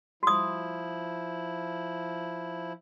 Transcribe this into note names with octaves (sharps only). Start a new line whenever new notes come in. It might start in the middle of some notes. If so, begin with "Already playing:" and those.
F3 E4 F#4 D#6